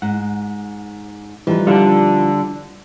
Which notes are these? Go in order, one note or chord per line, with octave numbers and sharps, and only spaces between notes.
G#2 F#5
E3 F3 G3 D#4 B4
D3 G3 D4 E4 F4